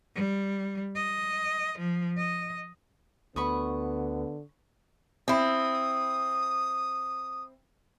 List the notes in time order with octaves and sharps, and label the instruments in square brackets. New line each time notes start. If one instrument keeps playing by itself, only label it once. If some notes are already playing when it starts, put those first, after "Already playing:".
[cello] G3
D#5
F3
D#5
[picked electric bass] D2 [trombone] D3 [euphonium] B3 [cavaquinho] B5 C#6 D#6
[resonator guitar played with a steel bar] C4 E4 [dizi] D#6